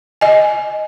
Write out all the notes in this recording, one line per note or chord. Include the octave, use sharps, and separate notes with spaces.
D#5 G#5